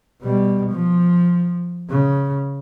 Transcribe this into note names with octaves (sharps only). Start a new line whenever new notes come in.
B2 G3
F3
C#3